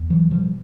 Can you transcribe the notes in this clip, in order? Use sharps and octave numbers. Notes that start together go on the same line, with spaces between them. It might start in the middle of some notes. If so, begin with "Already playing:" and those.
Already playing: E2
E3 F#3
B2 F3 G3